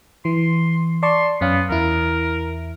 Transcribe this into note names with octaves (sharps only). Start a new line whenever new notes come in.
E3 C6
D5 A5 C6 C#6
F#2 B3 C#4 F5
E2 E4 A#4